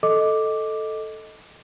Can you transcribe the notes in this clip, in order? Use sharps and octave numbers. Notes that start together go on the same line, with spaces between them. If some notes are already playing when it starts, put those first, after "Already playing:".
A4 D#5 D6